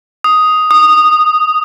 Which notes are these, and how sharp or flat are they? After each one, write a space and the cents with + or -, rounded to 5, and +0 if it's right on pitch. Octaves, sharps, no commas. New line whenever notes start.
D#6 +5
D#6 -15